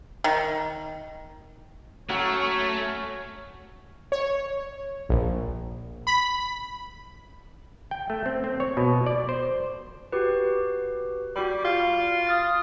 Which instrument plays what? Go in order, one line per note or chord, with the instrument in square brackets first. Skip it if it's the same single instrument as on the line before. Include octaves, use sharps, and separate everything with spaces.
[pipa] D#3
[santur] F#3 C#4 F#5 [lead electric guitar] A3 [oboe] C#5
[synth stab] C#5
A#1
B5
[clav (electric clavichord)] G5
A3
C4
C4
C#5
B2
D5
C5
[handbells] F#4 G4 B4
[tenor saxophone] G3 [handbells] F#4 B5
[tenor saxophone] F4
[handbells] D#6 F6 A6